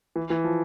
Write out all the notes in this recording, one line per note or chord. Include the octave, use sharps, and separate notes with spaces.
E3
E3
F3